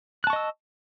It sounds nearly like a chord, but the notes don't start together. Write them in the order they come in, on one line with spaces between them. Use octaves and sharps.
F#6 A5 C#6 D#5 E6